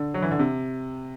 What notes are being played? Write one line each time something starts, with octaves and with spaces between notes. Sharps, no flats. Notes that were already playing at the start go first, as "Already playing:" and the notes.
Already playing: D3
F#3
E3
D3
C3